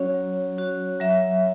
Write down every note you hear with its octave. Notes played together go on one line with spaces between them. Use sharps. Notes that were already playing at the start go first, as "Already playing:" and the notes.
Already playing: F#3 C#4 F#4 C#5
F#3
C#4 F#4
F#3 E5